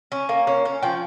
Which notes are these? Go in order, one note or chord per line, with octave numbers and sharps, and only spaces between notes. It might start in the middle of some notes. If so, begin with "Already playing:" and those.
C#4
A#3
C#4
C#4
F3 G5